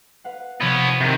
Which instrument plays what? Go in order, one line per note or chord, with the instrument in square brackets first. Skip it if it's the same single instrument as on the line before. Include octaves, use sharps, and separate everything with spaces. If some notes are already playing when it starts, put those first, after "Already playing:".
[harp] B4 F5 F#5
[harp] C3 F3 [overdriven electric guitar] B3 C#5
[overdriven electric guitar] C3 D#3